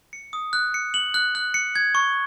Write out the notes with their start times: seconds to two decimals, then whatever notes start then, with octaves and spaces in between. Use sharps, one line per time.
0.13 C#7
0.33 D#6
0.53 F#6
0.74 C#7
0.94 F#7
1.14 F#6
1.35 F#6
1.54 C#7
1.76 G#6
1.95 C#6